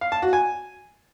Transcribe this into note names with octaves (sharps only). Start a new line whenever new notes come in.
F5
A5
F#4
G#5